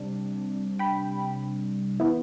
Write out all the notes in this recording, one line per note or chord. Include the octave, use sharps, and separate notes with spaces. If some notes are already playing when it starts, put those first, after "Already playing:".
Already playing: C3 G3 D4
G5 B5
E3 B3 E4